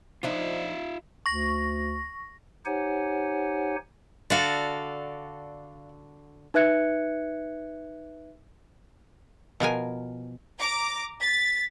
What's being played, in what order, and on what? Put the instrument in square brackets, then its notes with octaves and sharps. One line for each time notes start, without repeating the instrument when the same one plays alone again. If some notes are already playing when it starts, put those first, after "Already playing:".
[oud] F3 D4 D#4 [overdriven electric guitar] F4 E5
[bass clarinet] D2 [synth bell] C#6 A#6
[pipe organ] D#4 G4 C5 C#5 F#5 G#5
[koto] D3 F#4 A4 [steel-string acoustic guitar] D5 F5
[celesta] D#4 B4 E5 F#6 G#6 C#7
[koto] B2 F3 A#4 G#5
[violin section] A#5 D6
[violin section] A6 [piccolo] B6